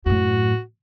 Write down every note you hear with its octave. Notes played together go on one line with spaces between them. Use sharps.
F#2 A2 F#4